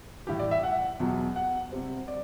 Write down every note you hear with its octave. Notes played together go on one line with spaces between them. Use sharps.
A2 E3 G3 G4
D5
E5
F#5
E2 B2 F#3
F#5
C3 G3 C4
D5